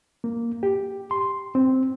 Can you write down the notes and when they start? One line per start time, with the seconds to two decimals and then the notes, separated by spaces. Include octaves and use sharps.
0.24 A#3
0.63 G4
1.11 C6
1.55 C4